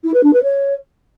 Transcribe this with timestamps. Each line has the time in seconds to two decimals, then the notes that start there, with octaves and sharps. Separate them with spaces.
0.04 E4
0.13 B4
0.23 D4
0.33 B4
0.43 C#5